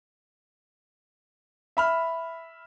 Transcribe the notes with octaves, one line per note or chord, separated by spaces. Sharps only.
E5 B5 F6